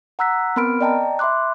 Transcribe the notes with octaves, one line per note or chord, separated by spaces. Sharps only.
F#5 A#5 E6 F#6 B6
B3 C4 A#4 B5 F6 D7
D5 D#5 G5 A5 A#5
E5 B5 C6 D6 F#6